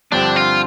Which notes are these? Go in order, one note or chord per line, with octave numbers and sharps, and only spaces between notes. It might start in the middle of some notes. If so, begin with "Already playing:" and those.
G2 D3 F3 C4 D4 G4
F4